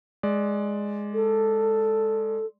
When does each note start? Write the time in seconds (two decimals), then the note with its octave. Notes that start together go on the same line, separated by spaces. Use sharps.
0.23 G#3 D5
1.14 A4